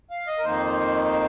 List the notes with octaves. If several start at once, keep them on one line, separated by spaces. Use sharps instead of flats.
F5
D#5
A#4
F2 D#3 A#3 D#4 C5